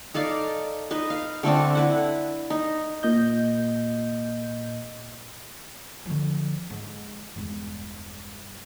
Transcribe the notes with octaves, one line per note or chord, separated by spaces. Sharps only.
D#4 A4 D5 F5
D#4 B4 D#5
F5
D3 A3 C4 D4
E4 B4 F#5
D#4
A#2 D#5 G6
D3 F3
G#2
E1 G2